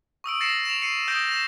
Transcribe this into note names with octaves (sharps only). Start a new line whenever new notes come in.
C#6 D#6 E6 D7
A6 A#6 C7 C#7 E7
E7 F7
C7 C#7 D#7
D#6 G6 A#6 D7 G7
A#6 E7